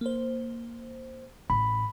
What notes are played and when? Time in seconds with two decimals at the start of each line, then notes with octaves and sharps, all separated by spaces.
0.01 A#3 C5
1.50 A1 B5